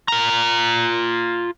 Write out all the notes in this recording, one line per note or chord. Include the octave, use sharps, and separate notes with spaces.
F4 A#5